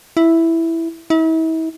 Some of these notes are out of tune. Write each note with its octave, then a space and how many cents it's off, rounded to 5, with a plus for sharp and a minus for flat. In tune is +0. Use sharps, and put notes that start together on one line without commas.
E4 +0
E4 -40